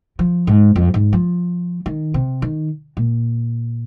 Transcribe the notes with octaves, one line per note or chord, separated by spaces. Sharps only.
F3
G#2
F2
G#2
F3
D#3
C3
D#3
A#2